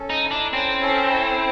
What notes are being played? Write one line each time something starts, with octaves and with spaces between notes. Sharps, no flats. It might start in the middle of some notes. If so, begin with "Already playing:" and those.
Already playing: C#4 A4
D#4
E4
D4
C4 C#4
A4
E4